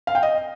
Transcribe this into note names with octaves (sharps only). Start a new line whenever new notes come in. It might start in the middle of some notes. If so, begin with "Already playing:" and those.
F5
G5
D#5